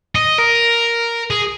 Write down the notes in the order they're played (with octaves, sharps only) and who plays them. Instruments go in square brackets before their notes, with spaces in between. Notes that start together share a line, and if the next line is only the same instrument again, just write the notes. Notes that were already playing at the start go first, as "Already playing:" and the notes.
[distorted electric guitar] D#5
A#4
G#4